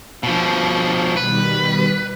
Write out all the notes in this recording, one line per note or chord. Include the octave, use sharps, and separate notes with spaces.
B2 F3
B2 D#3 G3 B4